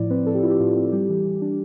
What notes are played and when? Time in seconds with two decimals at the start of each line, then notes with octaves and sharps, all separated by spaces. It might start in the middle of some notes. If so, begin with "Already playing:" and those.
Already playing: A2 F3 E4 D5
0.10 C4 B4
0.26 F3 A4
0.34 G4
0.43 E4 F4
0.50 G4
0.60 A2 F4
0.76 C4
0.92 G3 G4
1.09 E3
1.25 E3
1.42 D4